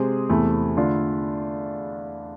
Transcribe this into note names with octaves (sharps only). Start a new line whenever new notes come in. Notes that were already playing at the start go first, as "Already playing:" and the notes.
Already playing: C3 G#3 C4 G#4
E2 C3 E3 A3
D3 A3 D4 F4